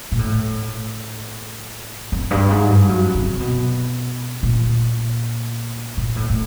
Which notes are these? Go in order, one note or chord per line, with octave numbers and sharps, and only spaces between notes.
A#2
A2
F2
G2
G#2
G2
F#2
C3
B2
A#2
A#2
A2
A2